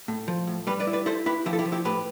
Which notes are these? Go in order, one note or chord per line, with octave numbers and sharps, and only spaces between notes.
A2
F3
A2
G3 G4 B4
B4 D5
E4
B4 D5
E4 A4 C5
E4 G4 B4
F3 E4 G4
A4
E4 G4
F3
E4 G4
A2 G4 B4